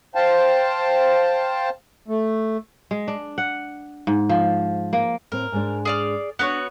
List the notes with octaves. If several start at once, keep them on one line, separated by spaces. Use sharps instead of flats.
C5 F5 G5 A5
A3
G#3
D4
F#5
G#2
F3
A#3
A2 C4 A#4
G#2 G#3 D4
G#4 D5 F6
B3 D4 F#4 C#5 F#5